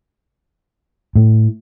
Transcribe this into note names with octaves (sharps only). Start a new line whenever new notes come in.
A2